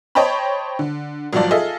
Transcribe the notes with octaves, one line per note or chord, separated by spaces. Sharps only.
C5 C#5 D#5 G5 A5 B5
D3
G#1 F3 F#3 F4 D5 A5
F4 G#4 A4 D#5 E5